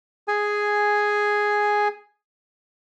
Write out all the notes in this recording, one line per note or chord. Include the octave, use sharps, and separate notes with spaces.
G#4 G#5